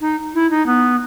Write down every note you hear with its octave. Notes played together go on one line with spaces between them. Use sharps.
D#4
E4
D#4
B3